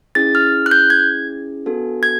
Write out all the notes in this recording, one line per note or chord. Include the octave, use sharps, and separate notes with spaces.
C#4 E4 G#4 A6
F6
F#6
G6
G#6
B3 D4 F#4 A4
G#6